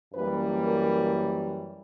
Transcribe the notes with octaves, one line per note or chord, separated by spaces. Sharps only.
F#2 E3 G3 A#3 B4
A#4